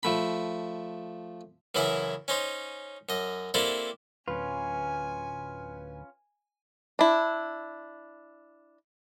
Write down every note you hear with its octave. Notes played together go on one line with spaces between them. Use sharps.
F3 A3 B5
F#2 C#3 E3 F#3 E4 E5
C#4 D#4 C5
F#2 D#5
A#3 C4 D4 E4 G4 A4
D1 C#4 F4 B4 G#5
D4 E4